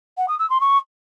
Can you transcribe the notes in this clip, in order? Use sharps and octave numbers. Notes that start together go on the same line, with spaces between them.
F#5
D#6
E6
C6
C#6